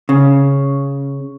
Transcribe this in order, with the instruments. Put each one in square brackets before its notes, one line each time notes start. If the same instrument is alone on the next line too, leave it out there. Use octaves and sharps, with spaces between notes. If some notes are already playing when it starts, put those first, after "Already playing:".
[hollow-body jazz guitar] C#3